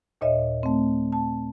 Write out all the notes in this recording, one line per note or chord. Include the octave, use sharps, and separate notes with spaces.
D#2 A#2 C#5 D#5 E5
A3 C4
A5